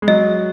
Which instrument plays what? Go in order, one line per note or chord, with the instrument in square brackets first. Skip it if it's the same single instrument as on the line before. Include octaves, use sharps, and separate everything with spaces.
[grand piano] G#3
[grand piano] F#3 [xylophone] D#5